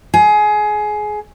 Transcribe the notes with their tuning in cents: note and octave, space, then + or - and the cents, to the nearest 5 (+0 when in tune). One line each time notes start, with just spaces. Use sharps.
G#4 +20